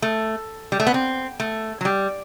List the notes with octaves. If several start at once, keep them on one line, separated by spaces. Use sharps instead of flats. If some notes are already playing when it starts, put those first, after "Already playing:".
A3
G3
A3
B3
C4
A3
F#3
G3